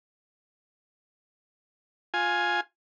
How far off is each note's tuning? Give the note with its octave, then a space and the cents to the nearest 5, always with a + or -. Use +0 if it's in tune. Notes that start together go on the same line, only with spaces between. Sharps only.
F4 +15 G#5 +5